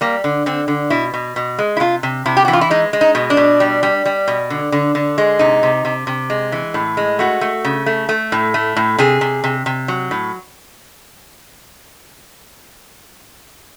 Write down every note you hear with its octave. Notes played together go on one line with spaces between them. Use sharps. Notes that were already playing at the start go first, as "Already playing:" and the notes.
G3 A#3
D3
D3 C4
D3
B2 E4
B2
B2
G#3
E4
C3 F4
C3
C3 E4
G4
E3 F#4
F4
E4
G#3 D#4
G#3
D#4
B2
D4
B2
G3
G3
G3
B2
D3
D3
D3
G#3
C3 D#4
C3
C3
C3
G#3
E3
A2
G#3
A3 F#4
A3
C#3
A3
A3
A2
A3
A2
C3 G#4
C3
C3
C3
F#3
A2